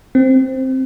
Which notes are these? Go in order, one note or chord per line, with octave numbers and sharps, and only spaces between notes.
C4